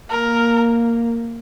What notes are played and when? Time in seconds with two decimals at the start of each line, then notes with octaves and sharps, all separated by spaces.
0.10 A#3 A#4